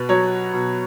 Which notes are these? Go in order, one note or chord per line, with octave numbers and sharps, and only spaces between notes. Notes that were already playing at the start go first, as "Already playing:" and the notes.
Already playing: B2 B4
F#3 C#5
B2